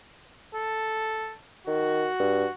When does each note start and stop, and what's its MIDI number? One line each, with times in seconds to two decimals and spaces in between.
0.55 1.36 69
1.67 2.06 51
1.67 2.54 66
2.20 2.45 43